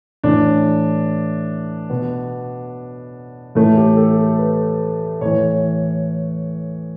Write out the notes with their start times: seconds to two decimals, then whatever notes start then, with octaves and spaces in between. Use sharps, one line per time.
0.23 A2 E3 D4
1.90 B2 B3
3.55 A2 E3 A3
3.77 G4
3.97 A4
4.18 A4
4.39 B4
5.21 A2 E3 C#5